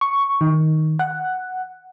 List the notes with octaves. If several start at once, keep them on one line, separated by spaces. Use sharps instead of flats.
C#6
D#3
F#5